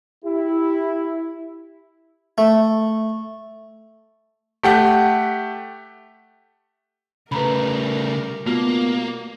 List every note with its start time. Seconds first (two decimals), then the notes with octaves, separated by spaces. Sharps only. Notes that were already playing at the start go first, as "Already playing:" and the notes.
0.25 E4 G4
2.38 A3
4.63 A3 G4 F#5
7.32 C#3 G3 A3 A#4 B4 A#5 B5
8.47 B2 A3 A#3 F4